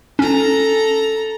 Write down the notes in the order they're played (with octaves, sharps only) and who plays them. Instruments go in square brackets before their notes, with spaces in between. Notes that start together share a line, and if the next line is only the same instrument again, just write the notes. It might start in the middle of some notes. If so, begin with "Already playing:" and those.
[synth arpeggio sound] C#4 [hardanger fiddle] A4 A#5